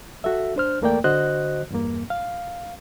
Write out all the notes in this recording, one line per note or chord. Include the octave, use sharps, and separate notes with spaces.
F#4 A4 E5
D4 C5 F6
E2 A3 A#3 A#4 D5 G5
D3 F#4 C5 D#5 F#6
E2 G2 A#3
F5